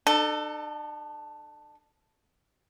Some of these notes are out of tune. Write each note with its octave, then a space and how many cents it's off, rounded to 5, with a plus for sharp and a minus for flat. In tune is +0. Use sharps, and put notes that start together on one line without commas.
D4 +45 A4 +5